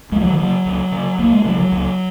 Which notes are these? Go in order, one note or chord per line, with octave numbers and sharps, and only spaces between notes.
C#2 G#3
F#3
D#3
C#3 F#3
C#2
C#3
C#2 A#3
G#3
C#3 F#3
F#3
C#2